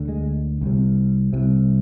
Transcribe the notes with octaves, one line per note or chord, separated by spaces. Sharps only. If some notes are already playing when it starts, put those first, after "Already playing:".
Already playing: D2 D3
G#3
C2 C3
C2 C3